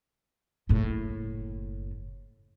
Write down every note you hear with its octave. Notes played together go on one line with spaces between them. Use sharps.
F#1 A2